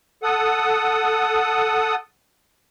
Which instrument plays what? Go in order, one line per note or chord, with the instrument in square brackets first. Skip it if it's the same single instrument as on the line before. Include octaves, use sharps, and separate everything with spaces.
[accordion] A4 F#5 D#6